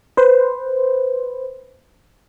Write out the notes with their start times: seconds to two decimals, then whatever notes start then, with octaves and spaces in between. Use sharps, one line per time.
0.17 B4 C5